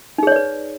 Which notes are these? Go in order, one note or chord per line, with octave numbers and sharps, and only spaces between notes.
D#4 G#4 B4 C#5 D5